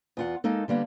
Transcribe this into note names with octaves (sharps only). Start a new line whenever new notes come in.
E2 F4 F#5
G#3 A#3 D#4 A4
D3 G3 A#3 B3